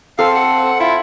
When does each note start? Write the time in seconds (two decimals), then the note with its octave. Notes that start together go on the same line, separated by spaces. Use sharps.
0.19 C4 A4 F5
0.35 F#5
0.80 E4 F4